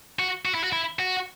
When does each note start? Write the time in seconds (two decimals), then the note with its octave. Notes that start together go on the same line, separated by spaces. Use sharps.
0.19 F#4
0.45 F#4
0.55 E4
0.64 F#4
0.73 E4
0.99 F#4